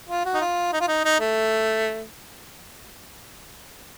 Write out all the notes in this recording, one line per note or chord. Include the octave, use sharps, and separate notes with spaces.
F4
F#4
D#4
F4
D#4
F4
D#4
D#4
A3